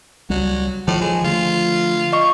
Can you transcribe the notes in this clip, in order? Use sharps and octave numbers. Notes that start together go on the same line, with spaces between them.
C#2 F#3 G3
A2 D#3 F3
G#3
D3 A3 F4
D#5 C#6